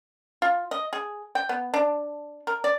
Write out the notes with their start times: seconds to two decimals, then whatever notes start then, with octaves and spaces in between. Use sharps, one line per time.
0.42 F4
0.71 D#5
0.93 G#4
1.35 G5
1.49 B3
1.74 D4
2.47 A#4
2.64 D5